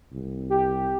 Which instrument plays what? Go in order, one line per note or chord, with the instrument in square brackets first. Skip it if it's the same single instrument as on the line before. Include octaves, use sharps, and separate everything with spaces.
[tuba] C2
[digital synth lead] G4